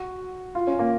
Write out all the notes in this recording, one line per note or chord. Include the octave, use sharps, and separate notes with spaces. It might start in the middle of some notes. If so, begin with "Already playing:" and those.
Already playing: F#4
F4
C#4
A#3